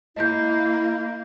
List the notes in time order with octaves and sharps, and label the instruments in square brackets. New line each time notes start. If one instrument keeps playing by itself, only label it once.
[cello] A#3 [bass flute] E4 [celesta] D#5 G6